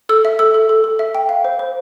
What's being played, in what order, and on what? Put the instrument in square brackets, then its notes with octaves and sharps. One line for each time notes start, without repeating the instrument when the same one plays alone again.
[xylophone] A4 E6
E5
A4 E6
A4
A4
A4
E5
G5
F5
C5
C5